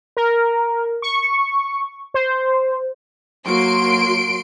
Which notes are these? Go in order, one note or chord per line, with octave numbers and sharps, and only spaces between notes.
A#4
C#6
C5
F#3 A#3 F#4 C6 D7